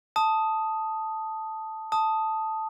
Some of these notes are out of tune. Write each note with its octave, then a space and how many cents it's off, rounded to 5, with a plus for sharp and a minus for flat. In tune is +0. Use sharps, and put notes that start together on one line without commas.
A5 +0 D#6 +0
A5 +0 D#6 +0